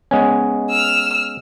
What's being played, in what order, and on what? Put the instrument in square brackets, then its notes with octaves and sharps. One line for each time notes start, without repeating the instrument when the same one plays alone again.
[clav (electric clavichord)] G#3 B3 C#4
[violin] E6 F6